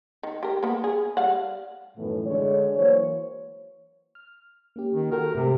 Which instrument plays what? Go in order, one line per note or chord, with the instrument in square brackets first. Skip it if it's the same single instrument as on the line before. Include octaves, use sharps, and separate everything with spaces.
[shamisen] D#3
G4 A#4
A#3 B3
G#4
G3 F5 F#5
[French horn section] F#2 A2 D#3 E3 A3 B3
D3 G#3 D4 C#5
E3 F#3 A#3 C5 C#5
[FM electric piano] F6
A#3 C#4 G4
[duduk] D#3
[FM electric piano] F#4 A4 G5 [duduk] A#4
[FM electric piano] G#2 A3 [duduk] C3